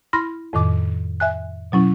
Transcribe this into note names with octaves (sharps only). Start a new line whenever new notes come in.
E4 B5 C6 F6 A#6
F2 A2 D#3 D6
E5 G#5 F#6
B2 F#3 C#4 E4